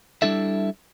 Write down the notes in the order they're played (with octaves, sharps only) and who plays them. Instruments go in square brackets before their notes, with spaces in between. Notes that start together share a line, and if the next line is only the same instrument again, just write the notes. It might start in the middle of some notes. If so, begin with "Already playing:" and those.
[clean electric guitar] G3 D4 E4 A4 E5